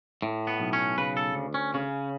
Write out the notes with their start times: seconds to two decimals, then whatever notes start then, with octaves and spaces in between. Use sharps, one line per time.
0.22 A2
0.47 B3
0.60 B1
0.73 C#4
0.98 C#3 B4
1.17 A4
1.35 D2
1.54 C#4
1.74 C#3 C#4